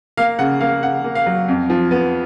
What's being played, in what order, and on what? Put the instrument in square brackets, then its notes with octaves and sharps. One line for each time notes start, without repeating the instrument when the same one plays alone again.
[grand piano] A#3 F5
C#3 F#5
A#3 F5
C#3 F#5
A#3
F5
F#3
F2
F3
B3